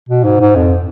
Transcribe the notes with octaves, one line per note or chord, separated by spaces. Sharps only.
B2
G#2
G#2
F2